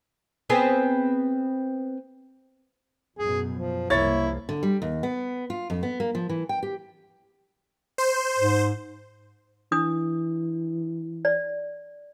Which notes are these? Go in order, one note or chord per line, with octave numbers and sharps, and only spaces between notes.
B3 C4 G#4
F#2 B2 G#4
F3
C2 F3 A#3 E4 C#5 A6
D3
G3
D#2
B3
F4
F2
B3
A#3
F3
E3
G5
G4
C5
G#2
E3 D4 D#6
D5